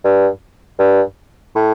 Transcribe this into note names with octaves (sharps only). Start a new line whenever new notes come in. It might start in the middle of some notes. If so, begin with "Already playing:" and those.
G2
G2
A2